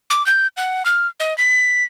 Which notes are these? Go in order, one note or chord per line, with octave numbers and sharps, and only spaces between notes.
D6
G6
F#5
F6
D#5
B6